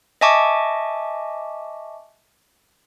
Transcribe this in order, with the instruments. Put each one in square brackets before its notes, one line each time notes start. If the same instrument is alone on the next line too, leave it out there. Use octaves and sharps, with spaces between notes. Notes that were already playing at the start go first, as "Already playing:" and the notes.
[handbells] D#5 E5 G#5 A5 C#6 D6